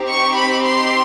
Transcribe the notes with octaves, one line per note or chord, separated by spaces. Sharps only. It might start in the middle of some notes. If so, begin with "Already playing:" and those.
Already playing: C4 D#4 G4
C#6
B5
C6